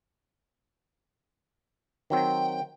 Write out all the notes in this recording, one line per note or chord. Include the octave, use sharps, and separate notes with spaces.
D#3 F#3 C4 G5